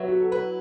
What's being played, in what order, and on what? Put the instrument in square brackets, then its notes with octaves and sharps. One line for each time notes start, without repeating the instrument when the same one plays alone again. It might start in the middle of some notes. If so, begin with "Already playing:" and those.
Already playing: [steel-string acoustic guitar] F#3 B3 [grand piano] E5
[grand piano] F#4
A4
[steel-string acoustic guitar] E4 [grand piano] B4